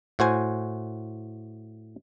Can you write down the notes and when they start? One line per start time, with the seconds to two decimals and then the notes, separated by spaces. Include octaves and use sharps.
0.19 A2 F#4 C5 G#5